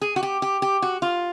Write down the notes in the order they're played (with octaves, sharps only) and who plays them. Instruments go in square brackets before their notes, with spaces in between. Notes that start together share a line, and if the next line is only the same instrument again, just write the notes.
[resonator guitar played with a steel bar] G#4
F#4
G4
G4
G4
F#4
F4